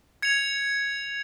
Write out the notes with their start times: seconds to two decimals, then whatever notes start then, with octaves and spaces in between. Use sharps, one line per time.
0.22 G#6 C#7 F7